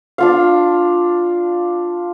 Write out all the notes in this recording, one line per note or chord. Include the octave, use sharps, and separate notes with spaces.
D4 F4 F5